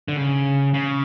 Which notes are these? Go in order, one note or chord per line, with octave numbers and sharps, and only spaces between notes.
D3
C#3
C#3